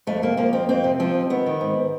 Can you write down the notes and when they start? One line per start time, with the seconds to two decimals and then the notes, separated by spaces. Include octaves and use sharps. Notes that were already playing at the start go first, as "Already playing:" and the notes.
0.07 F2 A3
0.22 C3 A#3
0.37 F3 A#3
0.53 F2 C4
0.69 F2 C4
0.84 C3
1.00 F3 C4
1.15 F2
1.30 D#3 B3
1.46 D#3
1.61 G#2